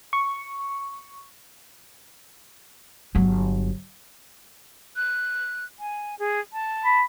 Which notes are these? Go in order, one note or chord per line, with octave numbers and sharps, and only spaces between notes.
C#6
G1 F#3
F#6
G#5
G#4
A5
B5